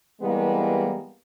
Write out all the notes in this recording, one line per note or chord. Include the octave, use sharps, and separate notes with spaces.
C3 E3 G3 G#3 A#3 B3